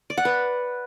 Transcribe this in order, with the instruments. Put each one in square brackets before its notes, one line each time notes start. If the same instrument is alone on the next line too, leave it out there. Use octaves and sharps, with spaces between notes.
[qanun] D5
F#5
B4